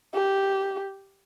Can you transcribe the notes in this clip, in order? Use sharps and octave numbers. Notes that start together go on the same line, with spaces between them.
G4